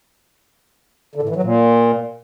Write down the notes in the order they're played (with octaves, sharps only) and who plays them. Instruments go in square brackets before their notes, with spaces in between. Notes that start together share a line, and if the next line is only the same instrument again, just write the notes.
[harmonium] D3
A2
E3
F#3
A#2